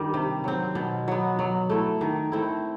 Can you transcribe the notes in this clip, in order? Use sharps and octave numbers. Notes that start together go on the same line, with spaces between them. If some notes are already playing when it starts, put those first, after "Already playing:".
Already playing: G2 D#3 G3
C3
F#3 C4
B2
F#3 B3
F#3
A3 E4
D#3
A3 C4 E4